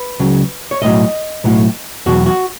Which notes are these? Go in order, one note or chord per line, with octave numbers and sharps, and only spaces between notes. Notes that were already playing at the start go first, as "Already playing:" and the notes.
Already playing: B4
C#2 C#3 F#3
C#5
B1 A2 F#3 D#5
B1 A2 F#3
E2 B2 F#3 F#4
F#4